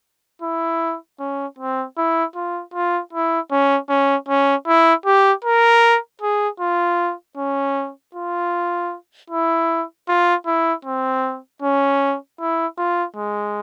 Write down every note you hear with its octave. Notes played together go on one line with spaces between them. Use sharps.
E4
C#4
C4
E4
F4
F4
E4
C#4
C#4
C#4
E4
G4
A#4
G#4
F4
C#4
F4
E4
F4
E4
C4
C#4
E4
F4
G#3